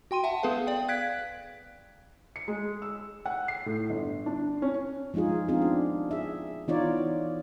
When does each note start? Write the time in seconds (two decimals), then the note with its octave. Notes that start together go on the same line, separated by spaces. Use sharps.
0.11 F#4 G5 C6 D#7
0.24 E5 F#5 A5
0.43 B3 G#4 A4 B4 F5
0.67 D5 G5
0.88 F5 F#6 G#6 B6 D7
2.36 C#7
2.48 G#3
2.82 E6
3.26 F#5
3.48 C7
3.66 A2
3.90 G1
4.26 D4
4.62 C#4
5.14 F3 G#3 D#4 F4 G#4
5.48 B3 C4 D4 D#4 F4 G#4
5.62 D4
6.11 G#4 E5
6.68 E3 B3 D#4 F4 C#5 D5